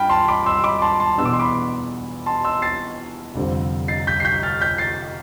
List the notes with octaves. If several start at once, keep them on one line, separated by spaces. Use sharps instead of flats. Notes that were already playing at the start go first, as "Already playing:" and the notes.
Already playing: G2 F3 G5 B5 F6
A5 C6
B5 D6
C6 E6
B5 D6
A5 C6
A5 C6
E2 B2 B3 D4 E6
D6
C6
B5 D6
A5 C6
C6 E6
A6 C7
F1 F2 D3 G3 C4
A6 C7
G6 B6
C7
G6 B6
F6 A6
G6 B6
A6 C7